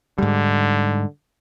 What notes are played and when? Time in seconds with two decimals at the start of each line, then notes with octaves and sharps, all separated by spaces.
0.18 G#2 D3 G3